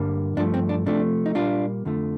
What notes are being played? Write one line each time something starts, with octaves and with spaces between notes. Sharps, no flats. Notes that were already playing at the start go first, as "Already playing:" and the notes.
Already playing: G2 D3 G3 A#3
G2 F3 A3 D4
C4
D4
C3 F3 A3 D4
D#4
A#2 G3 A#3 D4 F4
F2 D3 F3 A3